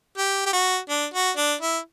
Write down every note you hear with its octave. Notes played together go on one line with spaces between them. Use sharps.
G4
G4
F#4
D4
F#4
D4
E4